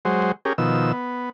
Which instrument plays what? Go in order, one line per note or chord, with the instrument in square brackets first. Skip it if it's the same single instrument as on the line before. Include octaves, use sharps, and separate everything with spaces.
[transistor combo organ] F#3 G#3 C5
C#4 G4 G#4 A#4
B2 D#3 F3 E6
B3